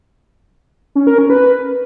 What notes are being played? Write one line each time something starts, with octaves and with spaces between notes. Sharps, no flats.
C#4
A#4
C#4
B4